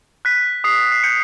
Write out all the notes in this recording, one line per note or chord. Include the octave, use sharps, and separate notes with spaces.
F#6 B6
D#6 C7
C7
G6 C#7